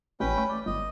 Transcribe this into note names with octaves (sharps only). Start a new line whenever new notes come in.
A1 C#4 B4 G5
A3
D5
G1 D#5